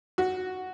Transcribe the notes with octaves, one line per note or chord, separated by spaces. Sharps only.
F#4